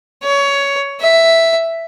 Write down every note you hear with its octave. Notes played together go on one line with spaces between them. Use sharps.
C#5
E5